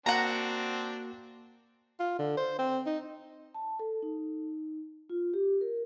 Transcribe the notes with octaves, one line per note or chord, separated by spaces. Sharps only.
A#3 C4 D4 F#4 F#5 A#5
F4
D3
C5
C4
D#4
A5
A4
D#4
F4
G4
A#4